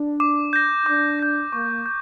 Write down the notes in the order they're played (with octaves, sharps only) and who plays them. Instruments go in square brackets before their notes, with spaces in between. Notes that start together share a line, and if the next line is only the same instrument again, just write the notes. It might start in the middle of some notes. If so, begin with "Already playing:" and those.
Already playing: [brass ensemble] D4
[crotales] D6
G6 A#6
[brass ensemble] D4 [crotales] D6
[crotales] G6 A#6
[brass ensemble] A#3 [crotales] C#6
[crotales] G6